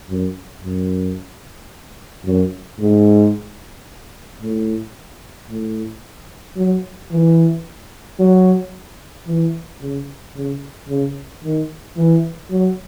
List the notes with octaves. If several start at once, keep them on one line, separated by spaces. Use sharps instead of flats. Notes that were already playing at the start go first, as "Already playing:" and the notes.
F#2
F#2
F#2
G#2
A2
A2
F#3
E3
F#3
E3
C#3
C#3
C#3
D#3
E3
F#3